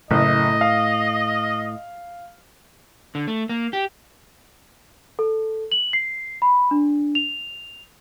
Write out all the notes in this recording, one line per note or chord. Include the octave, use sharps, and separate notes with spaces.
F#1 A2 D#5
F5
D3
A3
A#3
G4
A4
F#7
C7
B5
D4
F7